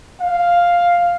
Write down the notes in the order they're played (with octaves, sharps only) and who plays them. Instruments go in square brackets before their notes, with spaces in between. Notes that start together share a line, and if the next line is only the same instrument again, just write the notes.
[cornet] F5